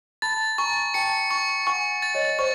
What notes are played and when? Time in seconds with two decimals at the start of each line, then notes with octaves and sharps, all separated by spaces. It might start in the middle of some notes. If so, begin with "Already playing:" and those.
0.22 A5 B5 A6
0.58 G#5 A#5 C#6
0.94 G5 A5 C#7
1.31 C#6
1.67 F#5 G#5 C#6
2.02 A6
2.14 C#5 D#5
2.28 C#5
2.39 C5 D5 C#6